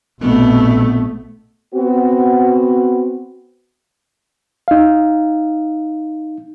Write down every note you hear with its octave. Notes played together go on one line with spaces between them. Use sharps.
A#1 B2 A3 B3 C4
B3 C4 F#4
D#4 F5